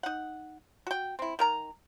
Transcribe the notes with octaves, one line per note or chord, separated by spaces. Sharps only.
D#4 F#5
F#4 G5
C4 E4
D#3 A#4 A#5